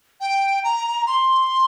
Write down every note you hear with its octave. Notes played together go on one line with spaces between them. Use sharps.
G5
A#5
C6